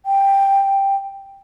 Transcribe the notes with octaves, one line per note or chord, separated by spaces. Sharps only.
G5